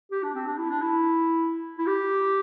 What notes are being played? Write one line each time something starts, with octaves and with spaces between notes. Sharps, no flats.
G4
D4
C4
D4
E4
D4
E4
E4
G4